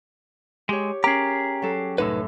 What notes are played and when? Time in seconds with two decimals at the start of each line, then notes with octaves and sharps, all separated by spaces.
0.69 G#3 G4 C#5
1.04 C#4 G4 G#4 A#4 A#5
1.62 F#3 A4
1.98 C2 F#2 A2 D#4 B4 E6